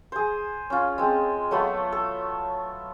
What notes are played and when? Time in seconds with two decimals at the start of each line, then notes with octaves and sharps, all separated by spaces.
0.12 G#4 C5
0.70 C#4 F4
0.98 G#3 C4
1.51 F#3 A3 B3 F4
1.92 A4